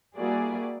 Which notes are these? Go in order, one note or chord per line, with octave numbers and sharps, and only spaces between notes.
G3 A#3 E4 F#4 G#4 D5